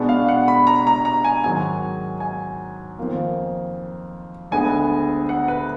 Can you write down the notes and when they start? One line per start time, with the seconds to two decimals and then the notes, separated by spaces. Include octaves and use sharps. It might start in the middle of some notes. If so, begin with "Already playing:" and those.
Already playing: B2 G#3 B3 D4
0.09 F5
0.28 F#5
0.48 B5
0.67 A#5
0.87 A#5
1.05 A#5
1.24 G#5
1.44 G#2 D#3 F#3 G#5
2.20 G#5
2.98 F2 D#3 A#3 F4
4.52 D2 D3 G#3 B3 G#5
5.29 F#5
5.48 B4